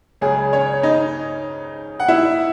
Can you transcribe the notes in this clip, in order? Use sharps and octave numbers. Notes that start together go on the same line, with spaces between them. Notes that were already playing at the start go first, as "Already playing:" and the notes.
C#2 C#3 F#3 C#4 G#4
C#4 C#5
D#4 D#5
F#5
E4 E5